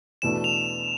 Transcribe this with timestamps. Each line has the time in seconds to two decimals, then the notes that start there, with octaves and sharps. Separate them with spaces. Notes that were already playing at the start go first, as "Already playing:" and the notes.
0.22 E2 B2 A3 D4 E7
0.44 F7